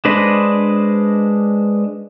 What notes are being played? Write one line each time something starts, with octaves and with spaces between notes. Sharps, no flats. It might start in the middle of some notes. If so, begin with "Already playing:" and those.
G#3 D4 B4 C5 D#5